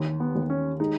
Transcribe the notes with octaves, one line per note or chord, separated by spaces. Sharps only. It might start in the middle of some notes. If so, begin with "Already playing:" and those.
Already playing: D#2
B3
D#2
C#4
G#3 D#4